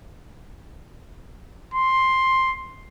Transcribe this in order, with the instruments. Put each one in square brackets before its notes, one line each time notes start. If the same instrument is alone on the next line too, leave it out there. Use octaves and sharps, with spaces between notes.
[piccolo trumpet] C6